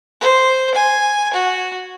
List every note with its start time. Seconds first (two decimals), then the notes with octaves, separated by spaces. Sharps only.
0.21 C5
0.75 G#5
1.34 F#4